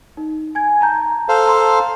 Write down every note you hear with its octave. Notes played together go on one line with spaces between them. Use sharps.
D#4
G#5 G#6
A5 A#5 G6
A4 C5 F5
A5 A#5 C6